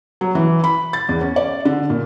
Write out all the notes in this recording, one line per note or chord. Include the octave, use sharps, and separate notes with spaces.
F#3
E3
B5
A6
E2
C#4
D5
D3
A#2